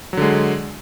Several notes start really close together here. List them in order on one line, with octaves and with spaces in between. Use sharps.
F#3 D3 G#3